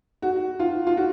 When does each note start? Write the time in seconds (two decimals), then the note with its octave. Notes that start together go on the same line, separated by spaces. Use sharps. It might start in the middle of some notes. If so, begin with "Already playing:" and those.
0.22 F#4
0.59 F4
0.87 F4
0.97 F#4